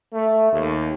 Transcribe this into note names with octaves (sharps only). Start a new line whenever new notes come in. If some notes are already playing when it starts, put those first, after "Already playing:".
A3
D#2